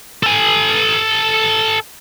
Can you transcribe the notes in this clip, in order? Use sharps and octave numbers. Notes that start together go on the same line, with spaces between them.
A4 G#5